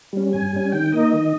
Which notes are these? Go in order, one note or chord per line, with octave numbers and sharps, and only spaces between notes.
G3 C#4
G2 G#5
G3 C#4
D#3 G5
A#3 D#4 D#5
D#3